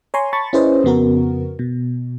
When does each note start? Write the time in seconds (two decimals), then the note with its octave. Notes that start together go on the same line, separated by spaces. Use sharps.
0.14 C#5 G#5 A#5 C6 C#6
0.33 A5 B5 C#6 A6
0.53 C#4 E4 G#4 B4 C5 D#5
0.84 F2 C#3 B3 F#4 A#4
1.59 B2